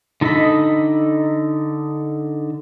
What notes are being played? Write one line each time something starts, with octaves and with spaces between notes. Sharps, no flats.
D3 D#4 A4 D#5 B5